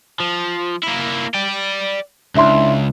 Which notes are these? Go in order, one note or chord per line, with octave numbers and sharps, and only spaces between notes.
F3
A#3 E4
D5 G5
C#2 D4 E4 C6